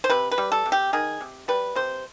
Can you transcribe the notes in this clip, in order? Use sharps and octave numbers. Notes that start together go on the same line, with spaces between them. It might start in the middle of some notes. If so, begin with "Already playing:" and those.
C5
C3 B4
B4
G3
A4
C3
G4
D#3 G#4
C3
G3 B4
C3 C5